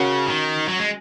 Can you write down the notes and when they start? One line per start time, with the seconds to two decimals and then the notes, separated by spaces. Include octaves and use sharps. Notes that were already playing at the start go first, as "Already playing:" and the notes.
Already playing: C#3 C#4 F#4 A#4
0.26 D#3
0.68 F#3
0.79 G#3